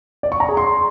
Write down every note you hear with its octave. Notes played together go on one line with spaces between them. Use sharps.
D5
C#6
A#5
G#4
C6